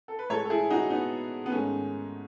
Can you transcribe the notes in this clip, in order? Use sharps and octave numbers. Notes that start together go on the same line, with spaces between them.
A4
B4
A2 G#3 A4 C#5
A4
E4 G#4
D#4 F#4
B3 D#4
B3
G#2 D#3 A3 C#4